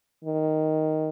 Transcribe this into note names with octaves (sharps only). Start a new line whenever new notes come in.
D#3